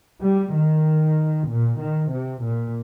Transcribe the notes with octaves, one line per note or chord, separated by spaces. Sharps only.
G3
D#3
A#2
D#3
C3
A#2